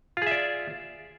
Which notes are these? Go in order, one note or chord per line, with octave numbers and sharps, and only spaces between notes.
F4 G#4 D5 E5